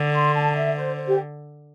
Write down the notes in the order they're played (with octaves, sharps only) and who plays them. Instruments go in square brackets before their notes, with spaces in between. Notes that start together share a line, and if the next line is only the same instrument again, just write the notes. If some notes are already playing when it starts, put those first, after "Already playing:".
Already playing: [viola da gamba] D3
[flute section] C6
A5
E5
C5
C5
G4